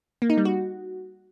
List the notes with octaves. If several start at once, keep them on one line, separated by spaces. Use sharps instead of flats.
A#3
D#4
G3
F#4